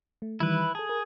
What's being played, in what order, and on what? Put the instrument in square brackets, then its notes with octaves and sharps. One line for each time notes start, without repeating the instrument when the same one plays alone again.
[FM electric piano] A3
[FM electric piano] D#3 E3 G3 [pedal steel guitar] E4 B4
[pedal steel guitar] G#4 [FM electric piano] A4 A5
[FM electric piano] A#4